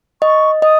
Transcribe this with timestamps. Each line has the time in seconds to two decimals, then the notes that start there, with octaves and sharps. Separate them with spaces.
0.21 D#5 C#6
0.62 D#5 D#6